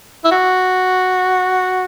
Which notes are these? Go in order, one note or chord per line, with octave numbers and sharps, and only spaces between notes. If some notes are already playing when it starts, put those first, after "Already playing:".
E4
F#4